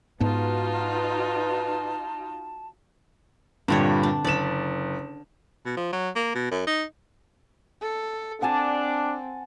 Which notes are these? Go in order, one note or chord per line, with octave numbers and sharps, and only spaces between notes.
G#2 B3 D#4 F4 F#4 B4 A5
G2 A#2 D3 G3 C4 C#5
D4
F#1 D5 B5 E7
B2
F3
F#3
A#3
B2
F#2
D#4
A4
C4 D4 F#5 G#5 A5